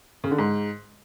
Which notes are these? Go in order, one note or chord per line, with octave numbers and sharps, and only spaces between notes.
C#3
D3
G#2